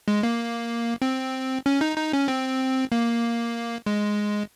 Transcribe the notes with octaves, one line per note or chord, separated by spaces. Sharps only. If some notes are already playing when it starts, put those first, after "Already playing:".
G#3
A#3
C4
C#4
D#4
D#4
C#4
C4
A#3
G#3